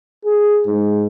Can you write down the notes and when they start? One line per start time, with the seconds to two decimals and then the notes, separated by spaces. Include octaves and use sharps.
0.25 G#4
0.66 G#2